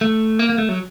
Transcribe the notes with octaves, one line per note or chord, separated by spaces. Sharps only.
A3
A#3
A#3
A3
F#3